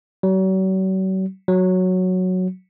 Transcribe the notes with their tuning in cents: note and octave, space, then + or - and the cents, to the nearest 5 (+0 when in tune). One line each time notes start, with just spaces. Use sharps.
F#3 +40
F#3 -5